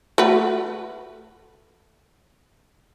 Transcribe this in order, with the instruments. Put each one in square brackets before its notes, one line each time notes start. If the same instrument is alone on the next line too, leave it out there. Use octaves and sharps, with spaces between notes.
[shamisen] A3 F#4 B4